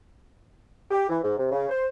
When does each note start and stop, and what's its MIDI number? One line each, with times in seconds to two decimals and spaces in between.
0.91 1.07 67
1.08 1.18 52
1.22 1.36 44
1.37 1.52 48
1.52 1.69 49
1.69 1.86 72